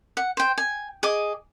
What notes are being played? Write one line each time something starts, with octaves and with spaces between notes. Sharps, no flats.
F#5
C5 G5
G#5
G#4 D#5 D6